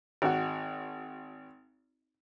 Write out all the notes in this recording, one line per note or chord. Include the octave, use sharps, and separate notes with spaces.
G#1 F#4